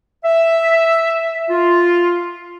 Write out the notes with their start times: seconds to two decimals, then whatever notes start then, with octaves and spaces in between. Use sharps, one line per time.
0.24 E5
1.50 F4